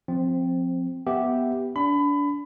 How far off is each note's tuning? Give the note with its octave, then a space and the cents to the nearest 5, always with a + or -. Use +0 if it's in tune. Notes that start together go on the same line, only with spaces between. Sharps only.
F3 +15 C4 +0
B3 +0 G4 +0 E5 +0
D4 -30 B5 +25